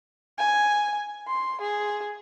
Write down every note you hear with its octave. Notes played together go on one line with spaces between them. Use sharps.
G#5
C6
G#4